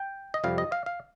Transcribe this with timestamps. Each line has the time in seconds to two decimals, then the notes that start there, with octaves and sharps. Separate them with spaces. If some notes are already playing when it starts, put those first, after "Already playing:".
Already playing: G5
0.34 D#5
0.44 F2 C3 G3 F5
0.58 D#5
0.72 F5
0.86 F5